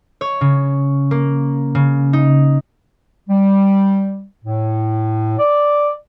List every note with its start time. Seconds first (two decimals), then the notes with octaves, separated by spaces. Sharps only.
0.21 C#5
0.41 C#3
1.11 A#3
1.75 C#3
2.13 D#4
3.30 G3
4.45 A2
5.39 D5